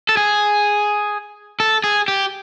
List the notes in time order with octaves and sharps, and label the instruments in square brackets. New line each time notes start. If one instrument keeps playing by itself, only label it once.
[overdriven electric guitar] A4
G#4
A4
G#4
G4